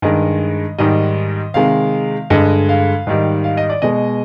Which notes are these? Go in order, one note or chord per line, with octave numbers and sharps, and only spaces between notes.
G2 D#3 G#3 D#5
G#2 D#3 G3 D#5
C3 D#3 G#3 F5
G2 D3 G#3 D#5
F5
G#2 D#3 G3
F5
D#5
D5
B2 G#3 D#5